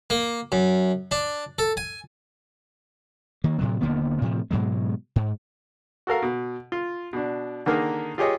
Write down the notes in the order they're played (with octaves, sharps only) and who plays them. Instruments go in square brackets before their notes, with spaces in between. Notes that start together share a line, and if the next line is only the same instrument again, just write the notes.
[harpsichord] A#3
F#2
D4
A4
G#5
[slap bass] D#3 A#3
A2 C3 F#3
D#1 D3 A#3 B3
A2 C3 E3 F3
G#2 B2 F#3 G#3
G#2
[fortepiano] F#4 A4 A#4 F5
B2
F4
B2 D4
D3 D#3 A#3 G#4 A#4
F4 G4 G#4 C#5 D#5